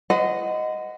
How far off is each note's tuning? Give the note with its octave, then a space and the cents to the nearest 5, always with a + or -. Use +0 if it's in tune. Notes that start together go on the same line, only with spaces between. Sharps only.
C5 -45 D#5 +0 F#5 +0